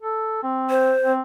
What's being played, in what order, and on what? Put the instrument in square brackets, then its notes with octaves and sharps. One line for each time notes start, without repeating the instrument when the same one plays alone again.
[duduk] A4
C4
[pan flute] C5
[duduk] C4